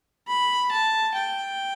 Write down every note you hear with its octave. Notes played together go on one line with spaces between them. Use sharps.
B5
A5
G5